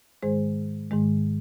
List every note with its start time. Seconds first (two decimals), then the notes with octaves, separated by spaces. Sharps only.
0.22 G#2 D#3 G#3 G#4 C5
0.91 G#2 D#3 G#3